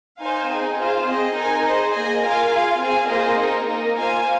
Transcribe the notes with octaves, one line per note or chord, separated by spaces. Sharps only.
D#4 C5 F5 G#5
C4 D#4 G#4
F4 G#4 C5 F5
C4 G#4 D#5
D#4 A#4 G#5
G#4 C5 D#5
A#3 G#4 D#5 G#5
F4 A#4 F5 G#5
F4 G#4 F5
C4 G#4 F5 G#5
A#3 F4 G#4 C5 D#5
C4 D#4 A#4
A#3 D#4 A#4
A#3 F4 C5 F5 G#5